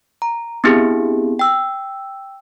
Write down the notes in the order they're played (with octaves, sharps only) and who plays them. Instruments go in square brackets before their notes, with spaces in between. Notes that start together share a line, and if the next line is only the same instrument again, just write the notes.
[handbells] A#5
B3 C4 D4 E4 G4 G#4
G5 E6